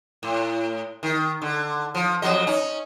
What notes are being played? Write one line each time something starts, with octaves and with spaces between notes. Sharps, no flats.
A2
D#3
D3
F3
F2 F#3 D#5
C#4 D#4